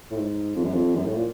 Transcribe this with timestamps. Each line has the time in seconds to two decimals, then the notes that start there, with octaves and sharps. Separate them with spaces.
0.11 A2
0.17 G#2
0.56 F2
0.64 F#2
0.74 F2
0.96 F#2
1.06 A2
1.16 A#2